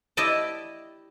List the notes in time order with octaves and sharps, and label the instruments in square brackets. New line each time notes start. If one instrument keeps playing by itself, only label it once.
[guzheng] E4 G4 D5 D#5 A5